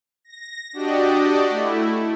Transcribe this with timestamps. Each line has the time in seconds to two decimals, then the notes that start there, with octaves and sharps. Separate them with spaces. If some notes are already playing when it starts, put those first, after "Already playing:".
0.25 A#6
0.73 D4 F#4 G4 D5 D#5
1.49 A3 E4